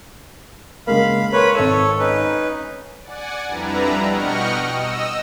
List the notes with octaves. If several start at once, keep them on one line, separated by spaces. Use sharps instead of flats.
C#3 G#3 A#3 F5 B5
A#4 B4 C#5 B5 C6
G#1 A4 C#5 D#7
C#4 D#4 B4
D5 F#5 G#5
F2 G3 D4 E4 B4 A#5
B2 D#5 F#5 G5 C#6 F6
D#5 E6